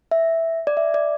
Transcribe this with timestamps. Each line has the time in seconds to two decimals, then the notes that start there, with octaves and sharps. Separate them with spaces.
0.11 E5
0.67 D5
0.77 E5
0.94 D5